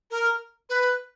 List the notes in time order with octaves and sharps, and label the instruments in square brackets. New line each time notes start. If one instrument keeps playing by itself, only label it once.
[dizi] A#4
B4